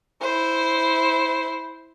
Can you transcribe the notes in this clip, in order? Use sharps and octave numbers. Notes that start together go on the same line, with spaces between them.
E4 C5